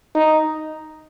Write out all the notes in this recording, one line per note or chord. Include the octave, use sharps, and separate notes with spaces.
D#4